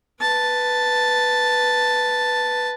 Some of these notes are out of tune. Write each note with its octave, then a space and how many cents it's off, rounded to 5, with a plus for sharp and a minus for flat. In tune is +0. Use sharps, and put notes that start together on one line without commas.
B4 +0 A5 +0